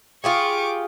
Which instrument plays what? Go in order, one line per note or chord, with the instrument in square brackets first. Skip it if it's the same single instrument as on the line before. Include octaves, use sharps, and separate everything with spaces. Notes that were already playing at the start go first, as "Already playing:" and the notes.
[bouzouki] F4 G4 G#4 [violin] C#6 D6